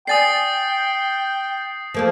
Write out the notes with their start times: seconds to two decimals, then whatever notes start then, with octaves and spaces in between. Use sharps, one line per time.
0.07 D5 G5 G#5 D#6 A6 C7
1.94 F3 A#3 A4